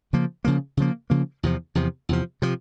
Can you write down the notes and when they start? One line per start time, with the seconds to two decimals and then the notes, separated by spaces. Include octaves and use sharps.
0.13 C#3 F3 A#3
0.45 C#3 F3 A#3
0.77 C#3 F3 A#3
1.10 C#3 F3 A#3
1.43 E2 C3 F3
1.75 E2 C3 F3
2.09 E2 C3 F3
2.42 C3 F3